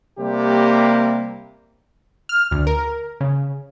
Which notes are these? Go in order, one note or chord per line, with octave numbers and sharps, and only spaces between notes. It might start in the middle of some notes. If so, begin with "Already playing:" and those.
C3 G3 A#3 G4
F6
D2
A#4
C#3